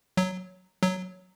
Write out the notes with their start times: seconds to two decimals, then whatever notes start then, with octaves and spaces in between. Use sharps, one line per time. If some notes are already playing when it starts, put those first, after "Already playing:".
0.17 F#3
0.83 F#3